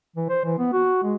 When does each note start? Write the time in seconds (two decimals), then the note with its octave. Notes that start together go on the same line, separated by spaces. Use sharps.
0.16 E3
0.29 C5
0.45 E3
0.59 B3
0.73 F#4
1.03 G#3